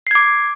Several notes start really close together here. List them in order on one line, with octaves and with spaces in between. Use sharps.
C7 G#6 D6